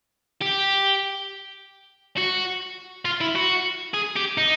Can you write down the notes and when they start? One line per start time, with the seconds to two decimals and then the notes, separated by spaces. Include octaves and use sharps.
0.42 G4
2.18 F#4
3.05 F4
3.21 E4
3.35 F#4
3.94 G#4
4.16 G4
4.37 D#4